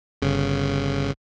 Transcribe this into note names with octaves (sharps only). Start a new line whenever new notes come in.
G1 C#3